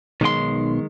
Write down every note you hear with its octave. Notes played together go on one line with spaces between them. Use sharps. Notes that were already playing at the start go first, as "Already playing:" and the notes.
B1 D#3 G#3 C6